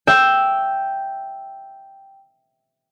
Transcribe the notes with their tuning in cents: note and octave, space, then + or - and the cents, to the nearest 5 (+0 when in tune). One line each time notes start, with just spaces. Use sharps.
E5 +0 G5 +0